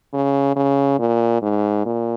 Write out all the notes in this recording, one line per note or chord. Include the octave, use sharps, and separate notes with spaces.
C#3
C#3
A#2
G#2
A#2